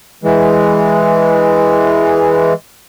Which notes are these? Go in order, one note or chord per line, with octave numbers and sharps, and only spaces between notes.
E3 G#3